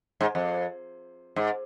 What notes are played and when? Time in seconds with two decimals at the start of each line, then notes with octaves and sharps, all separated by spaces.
0.21 G#2
0.35 F2
1.36 G#2